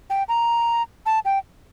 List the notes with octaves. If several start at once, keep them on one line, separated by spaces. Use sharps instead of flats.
G5
A#5
A5
G5